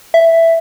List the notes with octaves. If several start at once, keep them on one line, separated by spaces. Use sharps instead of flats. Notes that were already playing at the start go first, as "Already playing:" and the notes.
E5